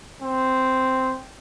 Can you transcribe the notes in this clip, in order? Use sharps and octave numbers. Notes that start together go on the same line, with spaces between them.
C4